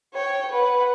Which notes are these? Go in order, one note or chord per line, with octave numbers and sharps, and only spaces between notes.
C#5 G5
B4 F#5